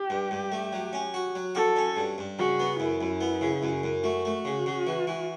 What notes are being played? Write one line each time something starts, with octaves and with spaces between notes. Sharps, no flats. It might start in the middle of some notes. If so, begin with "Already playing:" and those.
Already playing: G4
G2
G2
A3
F#3
C#4
F#4
F#3
F#4 A4
C#4
G2
G2
C#3 F#4
B3
F#2 E4
F#2
B3
C#3
F#2
F#2
A3 F#4
A3
C#3
C#3
E3
E3